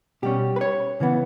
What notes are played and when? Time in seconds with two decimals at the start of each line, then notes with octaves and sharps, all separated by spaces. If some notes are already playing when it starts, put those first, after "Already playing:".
0.22 B2 G3 C#4 G4
0.56 B4
0.61 C#5
1.00 C#3 E3 B3